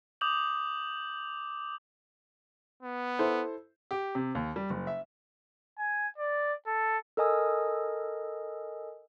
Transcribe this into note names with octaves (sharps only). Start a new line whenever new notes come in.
D6 D#6 G6 F7 F#7
B3
E4 A4 C5
G4
C3
D#2
G3
F#1
E5
G#5
D5
A4
A4 A#4 D#5 G#5 D#6 E6